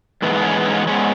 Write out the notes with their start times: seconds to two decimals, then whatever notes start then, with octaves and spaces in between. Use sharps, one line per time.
0.22 G#2 E3 G#3 B3
0.33 B3
0.44 C#4
0.55 B3
0.65 C#4
0.77 B3
0.87 G#2 G#3 B3 C#4